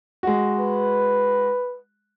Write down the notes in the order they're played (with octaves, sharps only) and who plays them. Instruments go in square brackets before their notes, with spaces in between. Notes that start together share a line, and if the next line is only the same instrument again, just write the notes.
[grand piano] G#3 F#4
[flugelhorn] B4